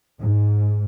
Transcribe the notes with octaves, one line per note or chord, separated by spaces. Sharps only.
G#2